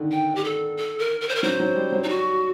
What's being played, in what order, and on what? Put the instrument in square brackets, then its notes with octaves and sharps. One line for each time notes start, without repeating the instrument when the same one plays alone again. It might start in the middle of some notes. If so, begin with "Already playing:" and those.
Already playing: [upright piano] D3 D#3
[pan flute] G5
G4
A4
A4
A#4
A#4
C5
A#4
[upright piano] F#3 [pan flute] C5
[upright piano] F#3
G3
F#3
[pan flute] D#4
F#4